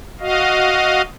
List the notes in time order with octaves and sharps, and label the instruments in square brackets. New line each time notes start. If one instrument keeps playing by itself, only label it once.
[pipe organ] F#4 D#5 F5